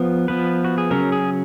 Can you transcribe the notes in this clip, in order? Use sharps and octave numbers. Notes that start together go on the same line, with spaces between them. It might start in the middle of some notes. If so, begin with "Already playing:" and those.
Already playing: F3 B3
F3 B3 B4
F#4
G#4
C#3 F#3 C#4 A#4
G#4